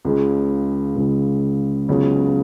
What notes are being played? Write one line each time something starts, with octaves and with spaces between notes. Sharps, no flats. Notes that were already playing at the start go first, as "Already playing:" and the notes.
C#2 C#3 G#3
C#2 C#3 G#3
C#2 C#3 F#3 B3